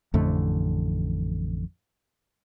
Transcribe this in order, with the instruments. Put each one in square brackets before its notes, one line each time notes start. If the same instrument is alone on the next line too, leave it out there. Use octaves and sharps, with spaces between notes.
[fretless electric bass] A1 F2 D3 A3